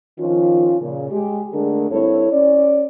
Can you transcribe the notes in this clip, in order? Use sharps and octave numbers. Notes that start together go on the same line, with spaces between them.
D#3 F3 C#4 F4
A#2 C#3
G#3 G4
D3 G#3 A3 D4 G#4 A#4
G2 C4 E4 A4 C#5
C#4 D5